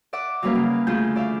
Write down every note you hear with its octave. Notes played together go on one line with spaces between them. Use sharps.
D5 E5 F#5 D6
F#3 G3 A#3 C#4 B4 F5
C#3
D2 E3 A3 F4 G#4 G6
D5 E5 F5